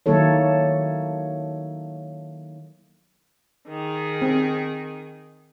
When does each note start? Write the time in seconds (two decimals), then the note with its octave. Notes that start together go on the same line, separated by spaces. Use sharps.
0.06 D#3 F#3 A#3 E4 A4 C#5
3.68 D#3 G#4
4.22 C4